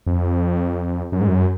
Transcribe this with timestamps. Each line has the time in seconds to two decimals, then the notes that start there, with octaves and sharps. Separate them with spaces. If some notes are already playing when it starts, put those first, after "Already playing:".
0.06 F2
1.12 F#2
1.21 G#2
1.28 F#2